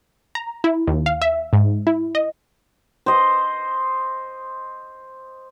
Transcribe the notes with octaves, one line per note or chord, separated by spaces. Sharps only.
A#5
E4
D#2
F5
E5
G#2
E4
D#5
C5 D#5